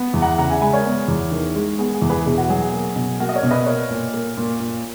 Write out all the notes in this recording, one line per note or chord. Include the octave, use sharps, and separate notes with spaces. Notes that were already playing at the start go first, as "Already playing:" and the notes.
Already playing: B3
E2
F#5 A#5
C#3 F#5 A#5
E5 G#5
G#3 G#5 B5
A#4 C#5
B3
E2
D#3
G#3
B3 G#4
G#4
E2
G#4 B4
B2 G#4
F#4
F#3 G#4
A#3
B2
A#3 F#4 A#4
D#5
A#4 C#5
B2
B4 D#5
A#3 A#4 C#5
A#2
A#3
A#2
A#2